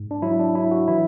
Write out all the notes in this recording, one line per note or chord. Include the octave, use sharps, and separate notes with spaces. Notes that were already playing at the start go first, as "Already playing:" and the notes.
Already playing: G#2
D4
F#3 E4
D4
F#3 E4
F#4
E3 E4